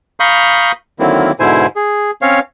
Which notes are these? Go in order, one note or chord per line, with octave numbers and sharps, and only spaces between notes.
F5 A#5 B5 C#6 D#6 G6
D3 D#3 F#3 A#3 C4 E4
G#2 B2 D3 E4 C5 G#5
G#4
C4 C#4 C#5 F5